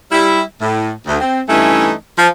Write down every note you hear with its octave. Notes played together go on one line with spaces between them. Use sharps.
G3 E4
A2
D2
C4
G2 E3 A3 C#4 D#4 E4
F3